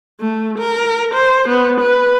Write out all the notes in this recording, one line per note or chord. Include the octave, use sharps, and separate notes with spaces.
A3
A#4
C5
B3
B4